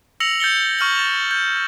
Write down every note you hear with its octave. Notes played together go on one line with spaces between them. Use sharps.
E6 A#6 C#7 F7 F#7
G6 A6 C#7 G7
C#6 F6 G6 F#7
A6 E7 F7
G6